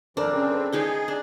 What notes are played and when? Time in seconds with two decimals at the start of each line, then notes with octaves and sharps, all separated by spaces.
0.17 F#2 E3 D4 A4 A#4 C5
0.32 C#3 C4 C#4 A#4 D5
0.50 A4 B4 C5
0.73 G#3 D#4 G#4 G5
1.08 D4